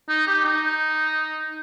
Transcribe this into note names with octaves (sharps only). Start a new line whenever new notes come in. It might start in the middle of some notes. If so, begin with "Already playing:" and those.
D#4
G4
D#4